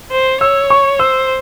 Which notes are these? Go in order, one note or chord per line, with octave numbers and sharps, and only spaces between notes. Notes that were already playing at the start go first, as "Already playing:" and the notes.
C5
C#5 E6
C#6
C5 E6